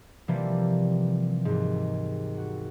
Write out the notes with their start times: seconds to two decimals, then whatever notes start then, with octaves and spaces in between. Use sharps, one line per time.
0.28 C3 E3 F3 G3 A#3
1.45 D#2 G#2
2.37 F#4